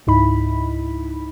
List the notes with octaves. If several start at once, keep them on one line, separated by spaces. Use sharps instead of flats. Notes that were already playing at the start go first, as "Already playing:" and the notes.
C#2 G#2 D#4 E4 B5